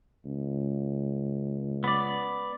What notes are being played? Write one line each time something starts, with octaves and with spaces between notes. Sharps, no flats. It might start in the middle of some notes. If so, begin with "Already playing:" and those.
C#2
B3 D5